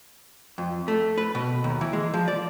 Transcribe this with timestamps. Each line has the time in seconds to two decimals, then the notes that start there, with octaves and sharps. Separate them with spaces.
0.58 F2
0.88 A3
1.18 B4
1.35 B2
1.64 D#2
1.81 E3
1.93 G#3
2.13 F3
2.28 D5